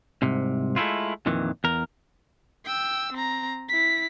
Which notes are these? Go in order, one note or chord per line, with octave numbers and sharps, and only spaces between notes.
C2 G#2 C3
G#3 A3 B3 E4 F4
F2 A#2 D#3 E3
E2 A#4
G5 E6
C4 A#5
E4 B6